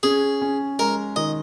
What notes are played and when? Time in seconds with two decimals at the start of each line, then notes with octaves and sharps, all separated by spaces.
0.03 C#4 G#4
0.42 C#4
0.79 G#3 A#4
1.16 D#3 D#5